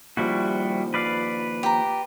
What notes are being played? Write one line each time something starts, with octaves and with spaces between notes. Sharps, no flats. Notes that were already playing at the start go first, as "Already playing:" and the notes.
D#2 F3 G3 E4 F#4
B4 D5 F5
G4 A#5